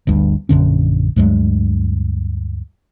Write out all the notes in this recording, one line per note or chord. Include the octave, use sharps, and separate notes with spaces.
G1 D2 G2
A#1 F#2 D3 C#4
D2 G2 F#3 G#3